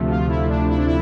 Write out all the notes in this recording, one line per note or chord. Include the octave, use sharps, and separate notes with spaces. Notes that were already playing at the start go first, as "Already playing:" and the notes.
Already playing: D2 C3 F3 A3
F4
E4
D4
E4
D4
E4